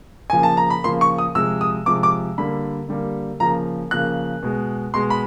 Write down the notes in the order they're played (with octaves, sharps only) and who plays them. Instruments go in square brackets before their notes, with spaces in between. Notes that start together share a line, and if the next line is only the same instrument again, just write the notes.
[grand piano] C#3 F3 A#3 G#5
A5
A#5
B5
C#3 F3 A#3 C6
C#6
D#6
C3 F3 G#3 E6
D#6
C3 F3 G#3 D6
D6
D3 G3 A#3 B5
D3 G3 A#3
C#3 F3 A#3 A#5
C#3 F3 A#3 F#6
B2 G#3
B2 G#3 C6
B5